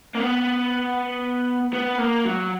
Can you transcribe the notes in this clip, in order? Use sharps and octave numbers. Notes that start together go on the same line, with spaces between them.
A#3
B3
B3
A#3
F#3